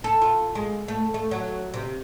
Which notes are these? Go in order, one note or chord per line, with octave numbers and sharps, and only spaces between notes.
A4
F4
G#3
A3
A3
F#3
C3